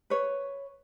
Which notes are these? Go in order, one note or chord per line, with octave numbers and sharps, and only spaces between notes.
B4 C#5